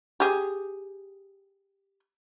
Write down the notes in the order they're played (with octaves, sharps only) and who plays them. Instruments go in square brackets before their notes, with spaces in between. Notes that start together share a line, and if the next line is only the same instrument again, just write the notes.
[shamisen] G4 G#4